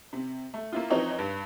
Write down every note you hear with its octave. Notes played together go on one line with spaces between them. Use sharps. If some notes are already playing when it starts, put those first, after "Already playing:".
C3
A3
A#3 E4 F4
E3 F3 C4 D#4 C#5
G2